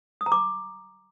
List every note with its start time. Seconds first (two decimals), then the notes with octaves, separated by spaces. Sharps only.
0.21 D#6
0.26 A#5
0.32 D6